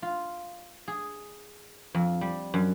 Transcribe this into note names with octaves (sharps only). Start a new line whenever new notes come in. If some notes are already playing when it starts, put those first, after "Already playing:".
F4
G#4
F2
G3
F#2